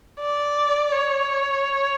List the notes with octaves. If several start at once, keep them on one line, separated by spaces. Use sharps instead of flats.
D5
C#5